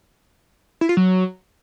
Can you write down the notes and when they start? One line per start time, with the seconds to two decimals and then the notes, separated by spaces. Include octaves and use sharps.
0.81 E4
0.89 F4
0.97 F#3